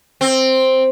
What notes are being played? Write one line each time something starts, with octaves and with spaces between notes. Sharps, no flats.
C4